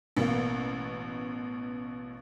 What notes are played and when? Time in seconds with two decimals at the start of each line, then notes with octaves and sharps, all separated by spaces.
0.17 A1 B2 A#3